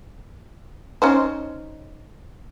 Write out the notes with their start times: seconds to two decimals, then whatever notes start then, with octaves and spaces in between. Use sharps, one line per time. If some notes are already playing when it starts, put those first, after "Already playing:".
1.02 C#4 D#4 C5